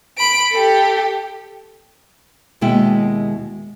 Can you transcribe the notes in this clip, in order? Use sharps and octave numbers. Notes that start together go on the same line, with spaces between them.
B5 D7
G4 A4
D#2 B2 G#3 E4 G5